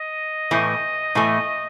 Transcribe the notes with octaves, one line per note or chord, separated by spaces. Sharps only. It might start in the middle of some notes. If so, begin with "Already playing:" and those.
Already playing: D#5
A2 E3 A3
A2 E3 A3